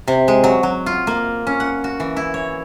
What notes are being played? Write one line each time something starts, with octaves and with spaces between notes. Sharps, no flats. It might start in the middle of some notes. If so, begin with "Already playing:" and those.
C3
G#3
F#3
F#3
F4
A#3
C#4
F#5
F#4
E3
E4
C#5